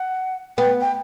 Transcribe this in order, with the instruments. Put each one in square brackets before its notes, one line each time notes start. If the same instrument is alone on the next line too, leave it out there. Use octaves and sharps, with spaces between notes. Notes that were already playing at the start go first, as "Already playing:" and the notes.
Already playing: [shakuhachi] F#5
[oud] B3 [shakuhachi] G5
[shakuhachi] G5